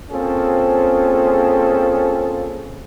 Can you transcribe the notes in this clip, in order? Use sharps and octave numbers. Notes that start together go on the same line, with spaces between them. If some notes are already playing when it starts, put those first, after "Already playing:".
A#3 C4 C#4 F4 G#4 A4